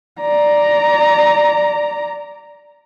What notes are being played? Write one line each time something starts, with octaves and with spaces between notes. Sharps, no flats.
D5 A#5